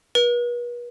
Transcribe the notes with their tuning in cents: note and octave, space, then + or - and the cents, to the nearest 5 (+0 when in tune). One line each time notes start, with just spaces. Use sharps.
B4 -40